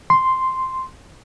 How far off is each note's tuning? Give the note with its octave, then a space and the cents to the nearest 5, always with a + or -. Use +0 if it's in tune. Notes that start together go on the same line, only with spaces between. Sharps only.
C6 -5